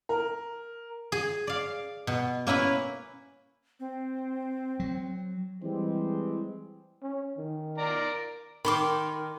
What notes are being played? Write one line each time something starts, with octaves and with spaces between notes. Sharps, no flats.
A#4
G#4
D5 F5
B2
A#3 C#4 E4 B4
C4
F#3
E3 G3 G#3 C4
C#4
D#3
A#4 D5 A#5
D#3 B5 C6 D6